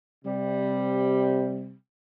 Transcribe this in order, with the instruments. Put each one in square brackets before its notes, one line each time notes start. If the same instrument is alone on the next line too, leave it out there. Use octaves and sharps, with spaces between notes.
[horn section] C3 G3